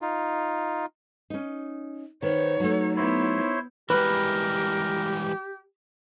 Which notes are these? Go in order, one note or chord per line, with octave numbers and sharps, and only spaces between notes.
D#4 F4
C#4 D#4
D#3 B3 C5 C#5
F#3 A3 D#4
B3 E4 C5 C#5
E3 G3 G#3 G4 A#4 B4